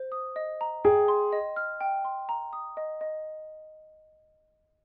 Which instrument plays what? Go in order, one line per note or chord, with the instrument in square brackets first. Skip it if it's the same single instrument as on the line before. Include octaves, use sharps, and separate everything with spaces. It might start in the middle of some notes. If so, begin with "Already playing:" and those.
Already playing: [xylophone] C5
D#6
D#5
A#5
[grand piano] G#4 [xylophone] G5
[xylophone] C6
D#5
F6
G5
C6
A#5
D#6
D#5
D#5